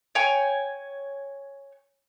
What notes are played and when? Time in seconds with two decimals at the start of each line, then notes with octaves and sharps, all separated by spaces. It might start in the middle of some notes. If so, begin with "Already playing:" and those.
0.15 C#5 G5 G#5